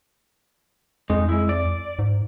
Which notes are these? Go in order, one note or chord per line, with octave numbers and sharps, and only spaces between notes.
F2 G#3 D#4
G#3 E4
D5
G#2